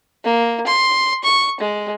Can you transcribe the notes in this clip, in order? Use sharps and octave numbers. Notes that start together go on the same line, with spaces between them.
A#3
C6
C#6
G#3